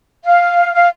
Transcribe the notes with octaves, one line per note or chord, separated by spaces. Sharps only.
F5
F5